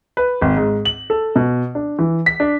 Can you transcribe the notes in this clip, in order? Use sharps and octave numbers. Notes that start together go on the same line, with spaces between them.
B4
G#1
G#2
F#7
A4
B2
D4
E3
B6
D4